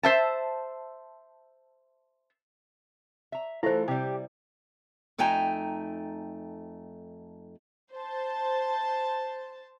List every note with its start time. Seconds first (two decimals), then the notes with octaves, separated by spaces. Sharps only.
0.03 C5 E5 A5
3.32 E5 A#5
3.63 E3 A3 E4 F4 C5
3.88 C3 G3 G4
5.18 F2 A3 D#4 G5 G#5 A#5
7.93 C5 A5